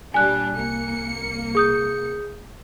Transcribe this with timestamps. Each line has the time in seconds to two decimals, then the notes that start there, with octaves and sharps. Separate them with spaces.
0.14 A#2 G3 D4 G#5 F#6
0.54 C2 A#3 C#7
1.55 G#4 D#6 G6